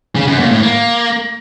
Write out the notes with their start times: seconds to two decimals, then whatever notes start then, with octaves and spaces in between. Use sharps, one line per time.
0.16 C#3
0.28 F#2
0.39 A#2
0.51 A2
0.63 A#3